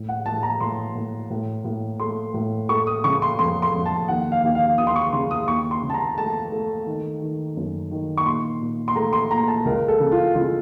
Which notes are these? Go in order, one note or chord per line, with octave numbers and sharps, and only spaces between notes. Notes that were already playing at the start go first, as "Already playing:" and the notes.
Already playing: A2
F#5
A2 A5
A#5
A2 C6
A2
A2
A2
A3 C6
A2
A3 C#6
D#6
C#3 C#6
C6
F2 C6
C6
F2
A5
D#2 F#5
F5
D#2
F5
D#2 D#6
C6
C#6
C#3 C6
D#6
D#2 C#6
C6
C#3
A5
A#5
A3 A5
A3
D#3
D#3
F#2
D#3
C#6
A#2 C6
A#2
C6
A3 A#5
C6
A#2 A#5
A5
C#2 A#4
A4
C#3
F4
C#3 F4